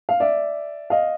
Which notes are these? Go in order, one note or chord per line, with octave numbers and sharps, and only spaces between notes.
F5
D5 E5
D#5 F5